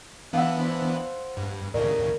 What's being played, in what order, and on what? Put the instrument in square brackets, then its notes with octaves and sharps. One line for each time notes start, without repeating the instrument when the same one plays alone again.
[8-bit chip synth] E3 B3 D4 [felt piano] F5 F#5 E6
[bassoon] C5
[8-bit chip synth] G2
[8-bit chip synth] D#2 A2 C#3 [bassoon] A#4 [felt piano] D5